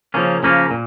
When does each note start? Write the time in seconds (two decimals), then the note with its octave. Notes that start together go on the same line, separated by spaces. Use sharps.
0.14 C#3 F3 A#3 C#4
0.43 C#3 F3 A#3 C#4
0.71 A#2